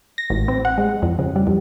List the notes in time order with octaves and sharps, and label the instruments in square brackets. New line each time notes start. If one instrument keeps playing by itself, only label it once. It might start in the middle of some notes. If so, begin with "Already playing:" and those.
[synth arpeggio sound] A#6
A1
C4
F#5
G#3
F2
C#3
G3
F2